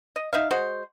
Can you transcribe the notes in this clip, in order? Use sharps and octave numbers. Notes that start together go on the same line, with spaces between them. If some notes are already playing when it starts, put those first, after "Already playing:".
D#5
D#4 E5 F5
G#3 F#4 C5